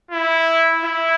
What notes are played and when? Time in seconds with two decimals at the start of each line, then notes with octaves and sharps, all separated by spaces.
0.11 E4
0.84 E4